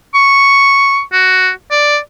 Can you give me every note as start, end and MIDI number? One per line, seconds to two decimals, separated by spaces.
0.14 1.01 85
1.12 1.50 66
1.71 1.99 74